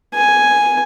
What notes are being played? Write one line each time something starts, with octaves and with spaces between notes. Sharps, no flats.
G#5